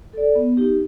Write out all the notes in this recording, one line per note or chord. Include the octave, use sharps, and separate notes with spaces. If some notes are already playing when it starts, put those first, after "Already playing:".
A4 D5
B3
D#4 G4